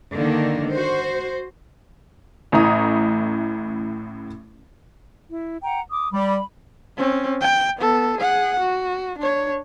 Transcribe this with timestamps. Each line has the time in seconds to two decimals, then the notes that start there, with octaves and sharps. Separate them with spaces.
0.13 D3 D#3 A#3
0.71 F#4 C5
2.52 A1 A2 A#5 D#6
5.28 E4
5.63 F#5 G5 A#5
5.91 D6 D#6
6.13 G3 B5
6.98 C4 C#4
7.41 G5
7.77 B3 A4
8.18 G#4 F#5
8.60 F#4
9.18 D4 C#5